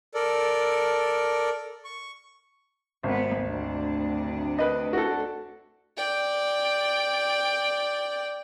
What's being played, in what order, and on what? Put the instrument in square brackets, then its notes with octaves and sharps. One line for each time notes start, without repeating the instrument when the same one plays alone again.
[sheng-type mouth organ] A4 A#4 D5
C#6
[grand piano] G#1 [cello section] C3 B3
[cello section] D2 C3 D4
[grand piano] B4 D#5
F#4 A4
[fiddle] D5 G5